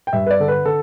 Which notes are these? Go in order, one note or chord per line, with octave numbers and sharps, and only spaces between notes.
G5
G2 E5
B4
D5
D3 A4
B4
D3 A4